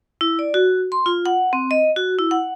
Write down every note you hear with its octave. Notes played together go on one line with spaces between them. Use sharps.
E4
D5
F#4
C6
F4
F#5
C4
D#5
F#4
E4
F#5